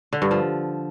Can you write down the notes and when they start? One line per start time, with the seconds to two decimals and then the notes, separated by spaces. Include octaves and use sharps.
0.13 D3
0.22 G2
0.31 F3